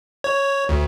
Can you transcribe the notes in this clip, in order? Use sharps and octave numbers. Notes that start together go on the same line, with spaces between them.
C#5
D2